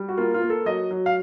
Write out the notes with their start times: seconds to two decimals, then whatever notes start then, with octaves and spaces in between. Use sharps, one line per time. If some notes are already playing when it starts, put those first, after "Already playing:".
Already playing: G3
0.08 F#4
0.17 A#3 F4
0.34 F4
0.41 A#3
0.50 A4
0.65 F#3 D#5
0.91 F#3
1.06 F5